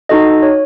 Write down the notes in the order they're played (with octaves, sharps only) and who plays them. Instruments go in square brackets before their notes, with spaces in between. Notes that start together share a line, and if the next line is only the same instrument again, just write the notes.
[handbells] D#4 F#4 A4 D#5
C#5